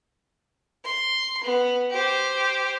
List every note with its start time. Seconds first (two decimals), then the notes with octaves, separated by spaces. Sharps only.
0.84 C6
1.43 B3
1.91 G4 C5